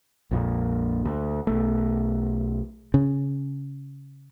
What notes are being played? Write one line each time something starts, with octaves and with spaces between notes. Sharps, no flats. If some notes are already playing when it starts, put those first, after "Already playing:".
A#1 F2 A#2
D2
B1 A3
C#3